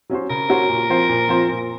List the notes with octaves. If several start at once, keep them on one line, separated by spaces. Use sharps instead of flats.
F#3 C#4 F#4 C5
C#3 A#4
F#3 C#4 F#4 C5
A#2
F3 C4 F4 C5
A#2
F3 C4 F4 C5
A#2